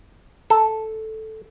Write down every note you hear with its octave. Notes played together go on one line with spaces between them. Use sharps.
A4